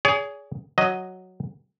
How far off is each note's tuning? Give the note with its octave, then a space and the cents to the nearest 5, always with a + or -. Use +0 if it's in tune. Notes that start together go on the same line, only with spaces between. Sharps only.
G#4 +0 C#5 +45
F#3 +0 D#5 +0